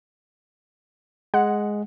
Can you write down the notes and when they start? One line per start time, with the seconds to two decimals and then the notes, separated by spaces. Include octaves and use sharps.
1.34 G#3 F#5